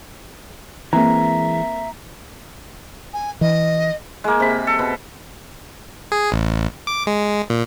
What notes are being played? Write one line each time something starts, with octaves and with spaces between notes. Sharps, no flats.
E3 G#3 A#3 C4 E5 A#5
G#5
E3 D#5
G#3 A#3
C3 B5
A4
B2
G#4
A1
D6
G#3
A#2